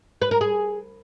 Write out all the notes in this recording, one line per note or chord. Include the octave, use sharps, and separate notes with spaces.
B4
A#4
G#4